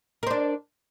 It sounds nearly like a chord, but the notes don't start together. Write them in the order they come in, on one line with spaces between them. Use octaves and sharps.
A#4 C5 D4